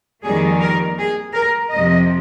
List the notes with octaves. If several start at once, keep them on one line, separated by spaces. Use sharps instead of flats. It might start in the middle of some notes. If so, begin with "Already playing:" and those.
F2 D#3 G3 A#3 G#4
A#4
G#4
A#4
F2 C3 F3 D#5